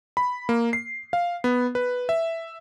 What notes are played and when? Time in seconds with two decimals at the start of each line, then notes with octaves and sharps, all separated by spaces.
0.17 B5
0.49 A#3
0.73 C7
1.13 F5
1.44 B3
1.75 B4
2.09 E5